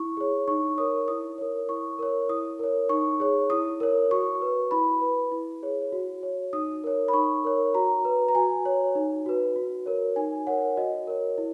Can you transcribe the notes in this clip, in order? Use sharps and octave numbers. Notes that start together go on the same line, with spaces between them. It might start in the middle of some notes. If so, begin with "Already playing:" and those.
Already playing: E4 C#6
G#4 C#5
D#4 C#6
A#4 C#5 D#6
E4 D#6
A#4 C#5
E4 C#6
A#4 C#5
E4 D#6
A#4 C#5
D#4 C#6
G#4 C#5
E4 D#6
A#4 C#5
F#4 C#6
B4
E4 B5
B4
E4
G#4 C#5
F#4
C#5
D#4 D#6
A#4 C#5
B5
D#4 C#6
A#4 C#5
F#4 A#5
B4
A#5
F#4 G#5
C#5
D#4
F#4 B4
F#4
A#4 C#5
D#4 G#5
A#4 C#5 F#5
F#4 D#5
A#4 C#5
E4